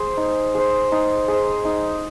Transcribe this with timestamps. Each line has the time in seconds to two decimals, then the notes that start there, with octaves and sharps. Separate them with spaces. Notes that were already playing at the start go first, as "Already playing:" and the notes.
Already playing: G#4 C5
0.17 D#4
0.55 G#4 C5
0.92 D#4
1.28 G#4 C5
1.65 D#4